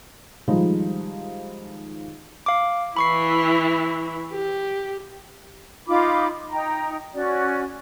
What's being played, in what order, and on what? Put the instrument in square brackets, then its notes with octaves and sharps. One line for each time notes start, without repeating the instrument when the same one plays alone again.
[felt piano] D#3 F3 G3 G#3 D#4
[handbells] F5 D6
[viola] E3 E4 [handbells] B5 C#6 C7
[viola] G4
[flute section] D#4 F4 B5 D6
D#4 G5 A#5
C#4 F#4 D5